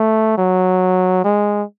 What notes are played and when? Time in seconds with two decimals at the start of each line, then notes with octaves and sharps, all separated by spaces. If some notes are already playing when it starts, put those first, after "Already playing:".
Already playing: A3
0.37 F#3
1.24 G#3